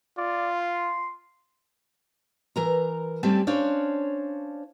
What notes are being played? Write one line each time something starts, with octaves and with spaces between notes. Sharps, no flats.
F4 D5
C6
E3 A#4 A#5
G3 A3 C4 C#4 G4 A4
C#4 D4 C5 C#5 F5